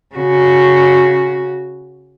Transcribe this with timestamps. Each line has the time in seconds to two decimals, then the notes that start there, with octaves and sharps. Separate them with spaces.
0.15 C#3 F#4